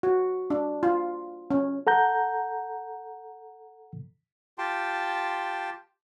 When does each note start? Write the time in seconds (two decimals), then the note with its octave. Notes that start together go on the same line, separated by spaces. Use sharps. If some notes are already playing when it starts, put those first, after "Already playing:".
0.03 F#4
0.50 D4
0.83 F4
1.51 C#4
1.87 A4 F#5 A#5 G6
4.58 F4 G4 G5 A5 C6